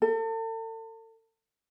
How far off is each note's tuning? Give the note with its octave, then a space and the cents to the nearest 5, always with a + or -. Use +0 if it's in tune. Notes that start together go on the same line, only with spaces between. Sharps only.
A4 +40